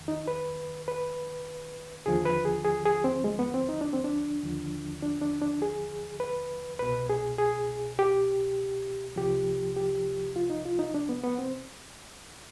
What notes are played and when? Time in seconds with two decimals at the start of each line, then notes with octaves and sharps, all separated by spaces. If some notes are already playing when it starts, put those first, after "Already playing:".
Already playing: F2 D#3
0.08 D#4
0.28 B4
0.88 B4
2.06 D#2 D3 F3 G#4
2.25 B4
2.45 G#4
2.64 G#4
2.85 G#4
3.04 C4
3.24 G#3
3.39 B3
3.54 C4
3.69 D#4
3.81 D4
3.93 C4
4.04 D4
4.43 D#2 D3 F3
5.02 D4
5.22 D4
5.41 D4
5.62 G#4
6.20 B4
6.79 C2 B2 B4
7.09 G#4
7.38 G#4
7.99 G4
9.16 C2 C3 F3 G4
9.77 G4
10.36 F4
10.50 D#4
10.65 F4
10.79 D#4
10.94 D4
11.09 B3
11.24 B3
11.39 C4